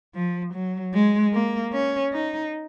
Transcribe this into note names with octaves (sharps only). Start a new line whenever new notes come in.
F3
F#3
G#3
A#3
C#4
D#4